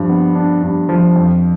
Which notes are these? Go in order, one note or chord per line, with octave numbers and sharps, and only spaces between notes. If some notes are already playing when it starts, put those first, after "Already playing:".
Already playing: G2 F3
B3
D4
G2
F3
F2